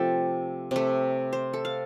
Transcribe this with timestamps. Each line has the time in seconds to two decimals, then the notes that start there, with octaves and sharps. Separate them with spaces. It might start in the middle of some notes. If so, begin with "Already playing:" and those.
Already playing: C3 F3 A3 G4 A4
0.71 C3 A3
1.33 C5
1.53 A4
1.65 F5